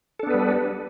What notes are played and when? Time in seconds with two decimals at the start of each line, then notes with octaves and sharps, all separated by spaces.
0.19 A4
0.23 D4
0.27 B3
0.30 B4
0.34 G3